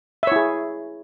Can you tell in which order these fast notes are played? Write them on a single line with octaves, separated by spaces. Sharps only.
E5 C#5 E4 G#4